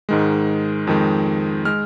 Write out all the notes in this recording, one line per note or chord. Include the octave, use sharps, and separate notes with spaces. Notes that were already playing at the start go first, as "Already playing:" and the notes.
G#2 D#3 G#3
F2 D#3 G#3
G#3 F6